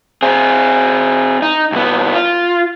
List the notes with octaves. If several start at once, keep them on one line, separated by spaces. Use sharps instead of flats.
C4 G#4
D#4
C2 B3
F4